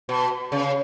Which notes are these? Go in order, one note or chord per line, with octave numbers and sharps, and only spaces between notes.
B2
C#3